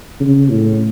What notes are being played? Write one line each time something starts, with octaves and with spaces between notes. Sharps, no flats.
C#3
A2